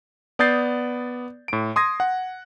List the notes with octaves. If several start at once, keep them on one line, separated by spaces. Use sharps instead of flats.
B3 D5 D#6 G6 A6 C7
A2 D7
C6 D#6 G#6 A#6
F#5